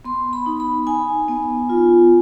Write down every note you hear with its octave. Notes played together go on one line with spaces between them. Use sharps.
B3 C6
B5
D#4
B5
D#4 G#5
B3
F4